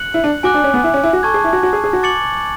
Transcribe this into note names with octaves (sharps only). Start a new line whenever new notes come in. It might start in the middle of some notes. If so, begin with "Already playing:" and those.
Already playing: F#6 C#7 F#7
E4
D4
F#4 G#5 D6 F#6
D4
C#4
B3
E4
C#4
E4
F#4
A4 A5 C#6 G#6
G#4
E4
F#4
F#4
G#4
G#4
F#4
D6 A6 C#7 F#7